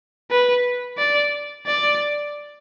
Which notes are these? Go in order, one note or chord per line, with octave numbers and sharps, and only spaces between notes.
B4
D5
D5